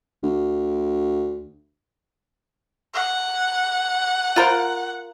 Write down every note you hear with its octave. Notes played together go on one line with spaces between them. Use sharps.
D2
F#5
F4 A#4 C5